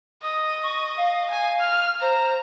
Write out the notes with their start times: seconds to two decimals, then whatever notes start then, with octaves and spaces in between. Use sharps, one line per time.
0.23 D#5 D#6
0.63 C#6
0.97 F5
1.31 G#5
1.60 F6
2.01 C5 A#5